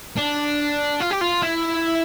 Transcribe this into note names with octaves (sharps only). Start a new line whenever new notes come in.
D4
F4
G4
F4
E4